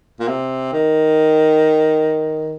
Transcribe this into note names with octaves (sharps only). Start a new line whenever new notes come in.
A#2
C3
D#3